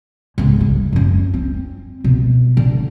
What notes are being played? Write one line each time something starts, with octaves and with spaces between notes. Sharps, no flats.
G#2 C#3
G2
F#2 C#4
C4
B2
D3